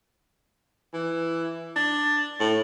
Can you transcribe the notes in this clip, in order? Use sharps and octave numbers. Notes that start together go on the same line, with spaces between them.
E3
D4
A2